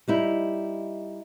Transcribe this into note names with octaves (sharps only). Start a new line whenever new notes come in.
G3 D#4 E4